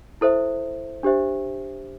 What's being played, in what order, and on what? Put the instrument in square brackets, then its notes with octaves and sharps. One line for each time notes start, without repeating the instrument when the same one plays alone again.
[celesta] E4 A4 C5 E5
D4 G4 C5 E5